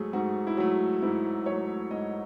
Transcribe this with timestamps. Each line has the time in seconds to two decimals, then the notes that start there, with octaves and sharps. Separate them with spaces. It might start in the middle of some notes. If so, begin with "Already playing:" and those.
Already playing: G#2 F#3 A3 G#4
0.13 G#2 F#4
0.47 E4
0.57 F#3 A3 F#4
1.02 G#2 E4
1.46 F#3 A3 C#5
1.91 G#2 D#5